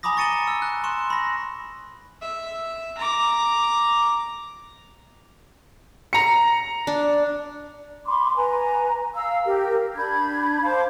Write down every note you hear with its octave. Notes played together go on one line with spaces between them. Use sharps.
G#5 A#5 B5 D6 D#6 A#6
C#6 A6 C#7 D#7 E7 G7
E6
F#6
C6 C#6 E7
B5 A#6
E5
A#5 D6
A#5 C#7
D4
B5 C6 D6
B4 G#5 A#5
F5 A#5 E6
G4 A#4
D4 B5 G6 G#6
C5 F5 A5 D6